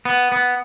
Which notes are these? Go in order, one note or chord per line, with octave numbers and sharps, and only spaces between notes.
B3
B3